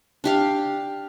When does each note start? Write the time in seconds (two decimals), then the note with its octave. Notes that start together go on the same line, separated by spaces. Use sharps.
0.24 D4 G4 F5